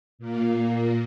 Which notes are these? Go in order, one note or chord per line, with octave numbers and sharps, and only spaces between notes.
A#2 A#3